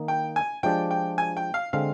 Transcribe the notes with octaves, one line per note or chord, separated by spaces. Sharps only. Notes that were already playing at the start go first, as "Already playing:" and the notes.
Already playing: D#3 A#3 D#4
G5
G#5
F3 G#3 D4 G4 D5 G5
G5
G#5
G5
F5
D3 G#3 C4 F5